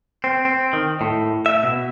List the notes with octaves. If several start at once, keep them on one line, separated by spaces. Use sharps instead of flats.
C4
C4
D#3
A2
E5
B2